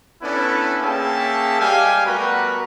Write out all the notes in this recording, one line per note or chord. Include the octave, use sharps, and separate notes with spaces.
B3 C#4 D4 E4 A4 B4
A#3 C#4 G#4 E5 G5 A5
G3 G#3 G4 F5 G5 G#5
G3 A3 B3 F#4 A#4 B4